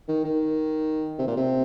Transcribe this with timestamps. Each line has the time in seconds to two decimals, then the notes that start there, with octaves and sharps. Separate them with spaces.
0.08 D#3
0.25 D#3
1.18 C3
1.27 A#2
1.37 C3